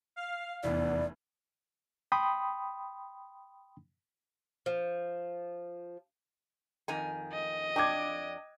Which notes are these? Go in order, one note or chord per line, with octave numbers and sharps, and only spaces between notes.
F5
F1 E2 B3 E4 D5
G5 B5 C6 D#6
F3
F2 D#3 G#5
D#5
F2 D4 G5 D6 G#6